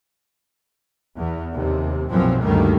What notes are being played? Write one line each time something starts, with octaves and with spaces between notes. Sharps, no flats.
E2
D#2 C3
B1 F#2 A#2 E3 F3 C4
D2 G2 D#3 G3 A3 A#3